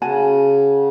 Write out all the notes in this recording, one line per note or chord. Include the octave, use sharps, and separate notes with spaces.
C#3 F#4 G#5 A5